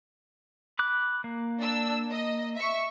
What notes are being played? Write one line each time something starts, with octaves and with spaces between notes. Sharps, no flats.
B5 D6 F#6
A#3
D4 E6
D#5
E5 C#6